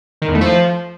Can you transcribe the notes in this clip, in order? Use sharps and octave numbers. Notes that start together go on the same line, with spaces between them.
D#3
E2
A3
F3